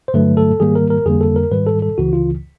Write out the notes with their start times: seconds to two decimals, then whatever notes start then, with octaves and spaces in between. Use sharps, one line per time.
0.08 C5
0.14 G2 D3 F#3 A3 B4
0.37 A4
0.60 G#2 D#3 G3 A#3 G#4
0.75 A#4
0.90 A#4
1.06 F2 D3 G3 A#3 G#4
1.21 A4
1.36 A#4
1.52 G#2 D#3 G3 B4
1.67 A4
1.82 A4
1.98 C#2 C#3 E3 F#4
2.13 F4